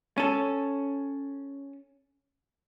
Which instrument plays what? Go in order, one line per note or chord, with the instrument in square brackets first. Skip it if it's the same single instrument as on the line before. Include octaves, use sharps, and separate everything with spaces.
[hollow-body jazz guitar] C#4 A4